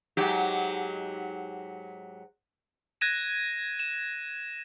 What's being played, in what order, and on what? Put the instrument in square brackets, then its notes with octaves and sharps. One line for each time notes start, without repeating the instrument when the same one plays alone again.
[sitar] G#2 F#3 G4
[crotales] F#6 G#6 A#6 D#7 E7
E7